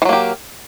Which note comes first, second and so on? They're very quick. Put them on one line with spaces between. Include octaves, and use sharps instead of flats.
E3 F#3 A#3 G4